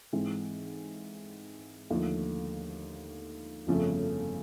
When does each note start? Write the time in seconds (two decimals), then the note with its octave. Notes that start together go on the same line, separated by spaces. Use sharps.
0.13 G#2 E3 G#3 C4
1.91 D#2 D3 F3 A3
3.67 G1 F2 C#3 F3 A3